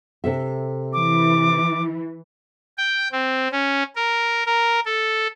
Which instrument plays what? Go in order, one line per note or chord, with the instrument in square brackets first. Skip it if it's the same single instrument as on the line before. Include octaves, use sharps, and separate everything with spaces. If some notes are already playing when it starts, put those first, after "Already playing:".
[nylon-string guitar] C3 A4 E5
[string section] E3 [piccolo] D6
[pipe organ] G5
C4
C#4
A#4
A#4
A4